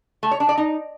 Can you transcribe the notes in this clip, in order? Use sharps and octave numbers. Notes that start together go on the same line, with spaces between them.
A3
C#5
D4
D5
D#4